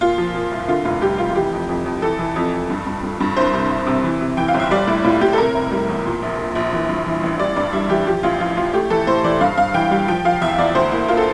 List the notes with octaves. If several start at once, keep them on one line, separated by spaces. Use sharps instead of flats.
A#2 F4
F3
A#2
C2
D3 F4
F1 F4
G3 G4
F1 F4
F4
E3 G4
F2
F2
F2
E3 A4
E3
F2
F2
G2
G2
G2
G2
C2 C5
C3
C2
C3
E3
C3
E3 G5
F5
G1
E5
G3 D5
A2 E4
A2 F4
A2 G4
A4
C3 A#4
F1
G3
E2
A#2
A#1
A#2
A#1
E3
G2
E3
A1
G3 D5
G2 D5
G3 E5
E3 G4
F3 G4
A1 F4
F3 F4
A1 F4
A3 G4
E3 A4
A2 C5
E3 D5
G2 F5
G2 F5
E3 G5
G3 F5
F3 G5
F3 F5
E2 E5
E2 D5
D2 C5
A#3 E4
A#3 F4
A4